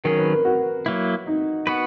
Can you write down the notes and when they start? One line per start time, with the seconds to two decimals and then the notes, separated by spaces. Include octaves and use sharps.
0.04 D#3 F#3 C#4 G#4 A#4
0.18 B4
0.33 A#4
0.45 F#4
0.86 F#3 A#3 E4
1.27 D#4
1.67 B3 F#4 B4